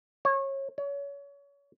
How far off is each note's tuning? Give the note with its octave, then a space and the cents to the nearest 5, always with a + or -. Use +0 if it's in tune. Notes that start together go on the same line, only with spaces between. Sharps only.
C#5 -25
C#5 +30